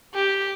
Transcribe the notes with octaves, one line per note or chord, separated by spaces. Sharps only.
G4